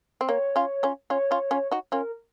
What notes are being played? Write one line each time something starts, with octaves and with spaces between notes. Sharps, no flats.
C4
A#3 C#5
C#4 F4
C#4 F4
C#4 F4 C#5
C#4 F4
C#4 F4
D#4 F#4
C#4 F4 A#4